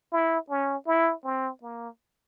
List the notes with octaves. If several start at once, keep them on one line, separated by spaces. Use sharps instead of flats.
E4
C#4
E4
C4
A#3